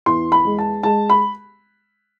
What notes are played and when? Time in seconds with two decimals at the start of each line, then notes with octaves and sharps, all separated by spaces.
0.06 E2 C6
0.32 B5
0.45 G#3
0.59 A5
0.83 G#3 A5
1.10 B5